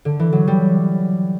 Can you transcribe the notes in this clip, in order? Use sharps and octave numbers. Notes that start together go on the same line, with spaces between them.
D3
E3
F#3
G3